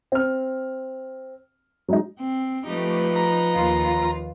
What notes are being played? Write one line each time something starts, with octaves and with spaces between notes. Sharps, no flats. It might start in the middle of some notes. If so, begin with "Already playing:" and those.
C4 F6
F#3 G#3 D#4
C4
F3 A3 D#4 G4 B4
A#5
D#2 F4